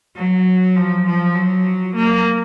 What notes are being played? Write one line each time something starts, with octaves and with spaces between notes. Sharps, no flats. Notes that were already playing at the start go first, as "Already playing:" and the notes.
F#3
F3
F3
F#3
A#3